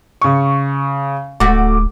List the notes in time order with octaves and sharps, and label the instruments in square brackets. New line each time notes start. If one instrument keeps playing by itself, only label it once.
[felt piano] C#3 C#6
[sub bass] D1 [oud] A3 F#4 [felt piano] D6